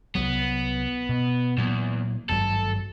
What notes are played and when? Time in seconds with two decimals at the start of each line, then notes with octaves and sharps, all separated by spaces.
0.15 C2 F#3 B3
1.09 B2
1.58 E2 A#2 F#3 A#3
2.30 G#1 G2 F#3 A4